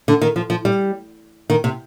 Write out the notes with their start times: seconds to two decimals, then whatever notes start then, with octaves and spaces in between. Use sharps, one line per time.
0.08 D3
0.21 D#3
0.36 F3
0.50 F3
0.65 G3
1.50 D#3
1.64 C3